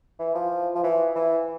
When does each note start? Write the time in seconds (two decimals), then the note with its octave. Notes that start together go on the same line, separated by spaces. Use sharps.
0.19 E3
0.35 F3
0.75 F3
0.83 E3
1.16 E3